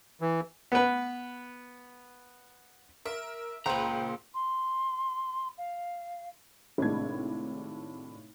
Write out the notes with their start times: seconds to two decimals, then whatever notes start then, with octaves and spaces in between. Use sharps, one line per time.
0.21 E3
0.72 B3 B4
3.05 A#4 E5
3.66 C#2 A#2 B4 C5 G5 A#5
4.34 C6
5.58 F5
6.78 G#1 A2 C3 G#3 D4 G#6